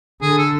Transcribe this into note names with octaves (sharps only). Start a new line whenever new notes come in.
D3 G#4
A4